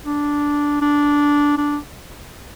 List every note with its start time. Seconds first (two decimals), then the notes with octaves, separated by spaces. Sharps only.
0.06 D4
0.82 D4
1.58 D4